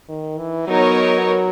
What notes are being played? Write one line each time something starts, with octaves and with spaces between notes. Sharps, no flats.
D#3
E3
F#3 B3 D#4 A#4 C#5